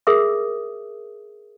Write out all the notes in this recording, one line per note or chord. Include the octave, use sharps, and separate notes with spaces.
G#4 A#4 E5 D#6 E6